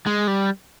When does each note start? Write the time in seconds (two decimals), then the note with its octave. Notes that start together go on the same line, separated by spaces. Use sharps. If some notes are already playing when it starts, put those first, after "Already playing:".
0.06 G#3
0.27 G3